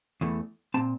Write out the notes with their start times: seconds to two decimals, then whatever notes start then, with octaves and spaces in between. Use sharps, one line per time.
0.21 E2 E3 A3
0.74 A#2 F3 C4 A5